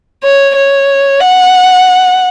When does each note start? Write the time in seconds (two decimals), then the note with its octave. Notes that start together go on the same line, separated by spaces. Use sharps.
0.24 C#5
0.56 C#5
1.20 F#5